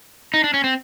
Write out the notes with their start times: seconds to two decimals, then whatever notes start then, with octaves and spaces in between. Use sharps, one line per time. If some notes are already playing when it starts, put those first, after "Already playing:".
0.34 D#4
0.44 D4
0.54 C#4
0.64 C4